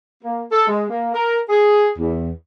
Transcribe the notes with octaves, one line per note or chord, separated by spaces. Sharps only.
A#3
A4
G#3
A#3
A#4
G#4
E2